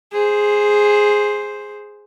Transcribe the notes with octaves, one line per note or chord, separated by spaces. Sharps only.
G#4 C5